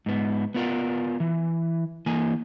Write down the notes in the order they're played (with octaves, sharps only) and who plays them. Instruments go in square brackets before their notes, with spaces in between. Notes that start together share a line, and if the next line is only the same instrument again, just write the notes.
[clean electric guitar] G#2 B3
B3 F4 A#4 F#5
E3
E3 A#3 G#5